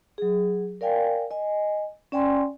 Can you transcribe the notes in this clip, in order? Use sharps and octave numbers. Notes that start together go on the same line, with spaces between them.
F#3 G#4
A#4 D5 F5 G5 G#5
D#5 G#5
C#4 D5 G5 G#5 C6